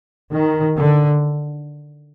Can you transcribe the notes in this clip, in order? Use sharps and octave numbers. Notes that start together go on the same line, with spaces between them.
D#3
D3